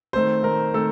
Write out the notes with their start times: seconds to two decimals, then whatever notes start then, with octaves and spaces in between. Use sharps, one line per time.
0.13 D#3 A3 C4 C5
0.43 D#3 A3 C4 A#4
0.73 D#3 A3 C4 A4